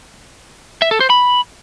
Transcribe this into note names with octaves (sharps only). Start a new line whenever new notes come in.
E5
A4
C5
B5